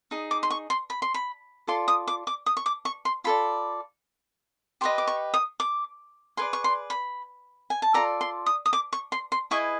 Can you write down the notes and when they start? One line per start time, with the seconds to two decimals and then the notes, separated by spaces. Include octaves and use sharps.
0.11 D#4 G#4
0.31 D6
0.43 C6
0.51 C#6
0.70 C6
0.90 B5
1.02 C6
1.14 B5
1.67 F4 A4 D5 C6
1.88 D#6
2.08 D6
2.27 D6
2.46 D#6
2.57 C#6
2.66 D6
2.85 C#6
3.05 C6
3.24 F4 A4 D5 B5
4.81 G4 B4 D#5 C6
4.98 D6
5.07 C#6
5.34 D#6
5.60 D6
6.37 G#4 B4 D5 C6
6.53 C#6
6.64 C6
6.90 B5
7.70 G#5
7.82 A5
7.94 F4 A4 D5 A#5
8.21 C6
8.46 D#6
8.66 D#6
8.73 D6
8.93 C#6
9.12 C6
9.32 C6
9.51 E4 G#4 B4 D#5 C#6